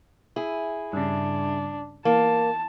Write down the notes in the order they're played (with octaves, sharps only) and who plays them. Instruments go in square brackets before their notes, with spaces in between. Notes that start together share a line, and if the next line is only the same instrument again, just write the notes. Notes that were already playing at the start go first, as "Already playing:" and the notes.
[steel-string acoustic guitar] E4 G#4
[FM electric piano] G2 C#3 [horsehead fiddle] D4
[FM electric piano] E3 [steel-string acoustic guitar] A#3 [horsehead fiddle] A5